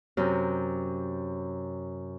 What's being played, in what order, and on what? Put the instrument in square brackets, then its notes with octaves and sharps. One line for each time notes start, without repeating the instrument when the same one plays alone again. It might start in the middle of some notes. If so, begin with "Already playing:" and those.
[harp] F#2 C3